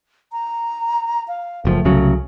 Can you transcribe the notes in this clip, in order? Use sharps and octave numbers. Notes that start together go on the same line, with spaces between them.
A#5
F5
F#1 A#2 F3 A3
C2 C#3 F#3